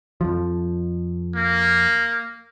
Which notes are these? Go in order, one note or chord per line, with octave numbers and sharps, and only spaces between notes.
F2 F3
A#3